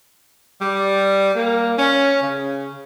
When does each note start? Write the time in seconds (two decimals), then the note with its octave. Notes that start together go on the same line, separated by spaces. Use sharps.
0.62 G3
1.35 A#3
1.78 C#4
2.22 C#3